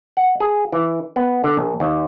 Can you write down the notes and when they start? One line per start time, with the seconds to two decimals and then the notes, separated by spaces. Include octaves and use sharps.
0.17 F#5
0.40 G#4
0.72 E3
1.16 B3
1.44 D3
1.57 A#1
1.80 D#2